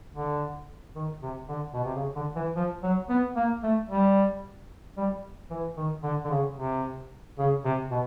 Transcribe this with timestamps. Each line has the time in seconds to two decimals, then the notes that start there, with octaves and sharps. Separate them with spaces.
0.15 D3
0.95 D#3
1.22 C3
1.49 D3
1.74 B2
1.84 C3
1.96 C#3
2.16 D3
2.36 E3
2.56 F3
2.83 F#3
3.09 B3
3.36 A#3
3.63 A3
3.90 G3
4.97 G3
5.50 E3
5.77 D#3
6.03 D3
6.25 D3
6.30 C#3
6.58 C3
7.38 C#3
7.65 C3
7.91 B2